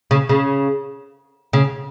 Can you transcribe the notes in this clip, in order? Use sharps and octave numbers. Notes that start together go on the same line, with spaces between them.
C#3
C#3
C#3